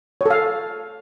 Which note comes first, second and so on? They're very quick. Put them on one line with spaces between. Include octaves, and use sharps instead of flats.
C#5 A4 F5